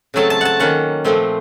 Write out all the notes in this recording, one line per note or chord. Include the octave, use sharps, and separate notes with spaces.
C#3 F#3 A3 C4 A5
A5
F#5 A5
D#3 A#3 C#4 F#5
A#2 F3 A3 C4